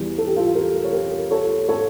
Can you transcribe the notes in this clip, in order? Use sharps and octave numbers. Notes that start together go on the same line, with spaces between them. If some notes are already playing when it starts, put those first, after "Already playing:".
Already playing: E2 E3 G3
A4
G4
F4 A4
G4 A#4
C#5
G4 A#4
A4 C#5
A4 C#5